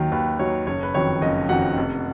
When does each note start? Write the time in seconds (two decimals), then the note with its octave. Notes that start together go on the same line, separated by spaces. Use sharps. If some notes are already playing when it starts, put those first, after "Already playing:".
Already playing: D#2 D#3 F#3
0.12 D#2 B4
0.39 D#3 F#3 C#5
0.67 F#1 C#5
0.83 B4
0.94 F2 D#3 F#3 C#5
1.21 F#1 D#5
1.49 F2 D#3 F#3 F#5
1.77 F1